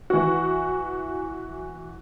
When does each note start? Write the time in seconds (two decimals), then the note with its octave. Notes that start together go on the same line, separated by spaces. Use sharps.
0.10 E3 F#4